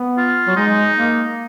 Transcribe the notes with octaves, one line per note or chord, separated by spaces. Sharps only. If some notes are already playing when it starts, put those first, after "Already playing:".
Already playing: B3
F4
F#3
G#3 D#4
A#3